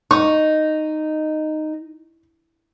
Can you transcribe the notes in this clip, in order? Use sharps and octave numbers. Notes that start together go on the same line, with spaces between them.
D#4 C#6